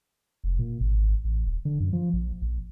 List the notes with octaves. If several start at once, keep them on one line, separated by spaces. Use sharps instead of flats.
F1
A#2
G#1
A1
D#1
D3
F#2
F3
A#1
A#1